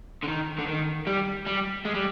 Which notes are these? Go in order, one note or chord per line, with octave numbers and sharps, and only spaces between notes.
D3
D#3
D3
D#3
G3
G3
G#3
G3